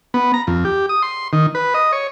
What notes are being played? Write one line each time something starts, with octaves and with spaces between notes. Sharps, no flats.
B3
A#5
F2
G4
D#6
C6
D#3
B4
D#5
C#5